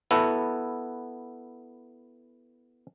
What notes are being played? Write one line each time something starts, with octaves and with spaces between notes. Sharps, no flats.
B3 E4 F#4 A4